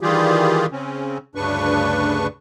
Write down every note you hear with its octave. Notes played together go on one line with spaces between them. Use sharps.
D#3 E3 G3 F4 G4 G#4
C#3 C4 C#4
D2 G2 C#3 D4 B4 C#6